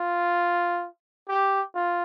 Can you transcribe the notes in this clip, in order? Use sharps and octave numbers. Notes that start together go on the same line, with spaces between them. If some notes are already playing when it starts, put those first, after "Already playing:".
Already playing: F4
G4
F4